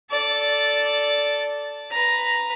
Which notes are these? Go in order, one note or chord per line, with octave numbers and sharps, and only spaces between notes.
A4 D5
B4 A#5